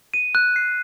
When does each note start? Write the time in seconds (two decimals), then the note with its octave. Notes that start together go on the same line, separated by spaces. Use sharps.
0.14 D#7
0.35 F#6
0.56 C7